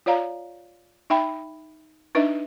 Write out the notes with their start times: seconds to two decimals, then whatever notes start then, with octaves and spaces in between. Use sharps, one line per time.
0.06 F4 C#5 D5 F5 A#5
1.10 D#4 E5 G5 B5
2.15 D4 D#4 B4 D#5 E5